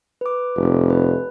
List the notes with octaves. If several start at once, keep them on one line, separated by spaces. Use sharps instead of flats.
B4 D6
F1
B4